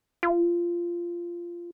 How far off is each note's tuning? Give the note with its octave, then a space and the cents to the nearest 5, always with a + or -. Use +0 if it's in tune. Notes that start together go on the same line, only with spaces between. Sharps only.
F4 -15